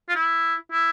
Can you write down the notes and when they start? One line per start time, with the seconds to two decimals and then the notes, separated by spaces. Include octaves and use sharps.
0.09 F4
0.15 E4
0.72 E4